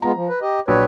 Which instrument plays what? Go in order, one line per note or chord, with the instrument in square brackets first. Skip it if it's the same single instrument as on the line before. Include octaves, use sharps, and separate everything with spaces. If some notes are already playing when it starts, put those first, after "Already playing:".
[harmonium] G#3 B3 F4 [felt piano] A#5
[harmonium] F3
B4
G4 D#5
[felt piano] A#1 F#3 [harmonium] B4 C#5